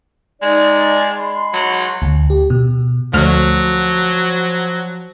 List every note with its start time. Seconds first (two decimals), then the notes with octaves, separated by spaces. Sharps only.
0.42 G#3 D#4 D5
1.19 G#3 B5 C6
1.53 F#3
2.02 D2
2.30 G4
2.50 B2
3.14 D2 F3 F#3 F6